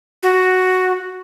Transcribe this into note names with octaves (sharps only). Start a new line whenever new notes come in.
F#4